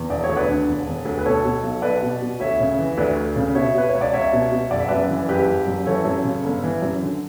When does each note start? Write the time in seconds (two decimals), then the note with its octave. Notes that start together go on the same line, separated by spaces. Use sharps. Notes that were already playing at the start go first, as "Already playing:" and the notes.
Already playing: E2
0.09 E1 D5
0.24 C#5
0.29 D2
0.37 B4 D5
0.48 D3
0.67 E1
0.87 E1
1.05 D2
1.19 B4
1.25 B2 A4 C#5
1.44 B2
1.63 B1
1.82 B1 B4 D5
2.02 B2
2.22 B2
2.40 D2 C#5 E5
2.60 C#3
2.79 E3
2.91 E5
2.98 D2 B4 D5
3.17 D2
3.36 C#3
3.55 B2 C#5 E5
3.74 B2 B4
3.89 C#5
3.95 C#2
4.01 D5
4.13 C#2 C#5 E5
4.33 B2
4.51 B2
4.70 F#1 D5
4.80 E5
4.89 F#2 B4 D5
5.09 E3
5.29 F#1 G4 B4
5.47 F#1
5.66 F#2
5.86 E3 A4 C#5
6.05 F#2
6.24 C#3
6.44 G1
6.63 E3
6.82 F#2
7.02 D3